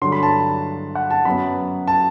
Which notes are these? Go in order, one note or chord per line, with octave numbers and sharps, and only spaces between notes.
G2 D3 F#3 C6
B5
A5
F#5
A5
F#2 F#3 B3 B5
A5